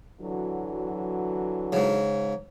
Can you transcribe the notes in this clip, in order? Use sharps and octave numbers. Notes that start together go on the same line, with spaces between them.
D3 E3 F#3
G#2 C#3